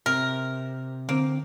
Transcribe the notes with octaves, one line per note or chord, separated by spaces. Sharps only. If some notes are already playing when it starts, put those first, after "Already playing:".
C3 A#4
D3 A#3 C4